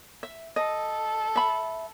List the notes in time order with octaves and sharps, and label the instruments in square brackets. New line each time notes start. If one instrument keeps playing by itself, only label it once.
[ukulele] E5
[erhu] A4 [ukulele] D#5
[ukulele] E5 B5